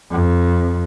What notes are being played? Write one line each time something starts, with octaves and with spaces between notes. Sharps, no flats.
F2